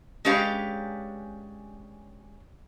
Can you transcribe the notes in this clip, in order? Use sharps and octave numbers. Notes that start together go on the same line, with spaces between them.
G#3 C#4 D4 G4 B4 F5